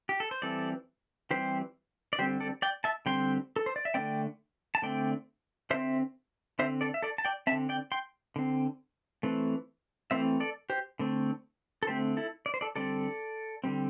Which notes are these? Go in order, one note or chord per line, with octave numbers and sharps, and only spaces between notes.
G4
A4
C5
E3 G3 C4 A4 D5
E3 G3 C4 G4 C5
D5
D3 G3 C4 G4 C5
A4 D5
D5 G5
E5 A5
D3 G3 C4 G5 C6
A4
C5
D5
E5
D3 A3 C4 D5 G5
A5
D3 A3 C4 D5 G5
D3 C4 C5 E5
D3 C4 C5 E5
A4 D5
E5
A4 D5
A5
D5 G5
D3 C4 E5 A5
D5 G5
G5 C6
D3 C4
E3 A3 C4
E3 A3 C4 C5 E5
A4 D5
G4 C5
D3 A3 C4
A4
D3 A3 C4 G4 C5
E4 A4
D5
C5
A4 D5
D3 G3 C4 A4 D5
D3 G3 C4